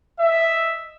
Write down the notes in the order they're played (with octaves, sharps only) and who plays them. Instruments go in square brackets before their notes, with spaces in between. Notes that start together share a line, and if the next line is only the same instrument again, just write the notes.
[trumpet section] D#5 E5